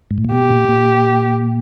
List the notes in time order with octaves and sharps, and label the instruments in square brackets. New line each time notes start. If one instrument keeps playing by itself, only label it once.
[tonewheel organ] G#2
A2
A#2
[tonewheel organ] B2 [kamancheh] G4
[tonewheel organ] A#2
A#2